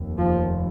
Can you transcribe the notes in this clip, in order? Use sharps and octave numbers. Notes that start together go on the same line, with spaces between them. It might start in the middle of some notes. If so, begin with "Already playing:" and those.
Already playing: F1 D#2
F3